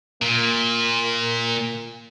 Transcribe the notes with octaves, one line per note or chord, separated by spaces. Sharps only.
A#2 A#3